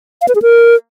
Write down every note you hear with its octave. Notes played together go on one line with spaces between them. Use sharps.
F5
B4
G#4
A#4